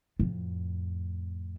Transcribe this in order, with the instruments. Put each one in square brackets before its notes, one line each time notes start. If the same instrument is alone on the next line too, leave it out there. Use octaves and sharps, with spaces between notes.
[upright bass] F2 A2